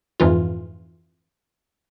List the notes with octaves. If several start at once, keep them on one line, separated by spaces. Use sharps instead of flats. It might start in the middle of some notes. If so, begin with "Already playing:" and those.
F2 G#2 E3 F4